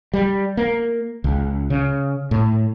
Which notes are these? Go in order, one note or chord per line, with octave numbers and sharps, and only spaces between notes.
G3
A#3
C#2
C#3
A2